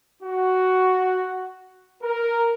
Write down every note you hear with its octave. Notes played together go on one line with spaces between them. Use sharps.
F#4
A#4